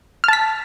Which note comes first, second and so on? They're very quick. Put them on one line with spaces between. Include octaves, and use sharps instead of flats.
F6 A5 B6